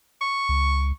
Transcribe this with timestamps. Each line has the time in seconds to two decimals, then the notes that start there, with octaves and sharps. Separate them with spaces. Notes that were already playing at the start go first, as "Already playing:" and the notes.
0.21 C#6
0.49 C#2